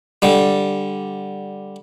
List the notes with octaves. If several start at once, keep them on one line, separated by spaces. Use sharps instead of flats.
D3 G3